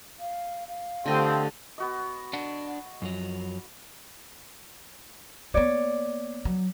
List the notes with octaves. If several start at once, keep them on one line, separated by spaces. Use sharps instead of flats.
F5
F5
D3 F3 A3 C4 G4 D#5
B3 F#4 D#5
D4 F#5
F#2 F3 F#3
A#3 B3 C#5 D5
F#3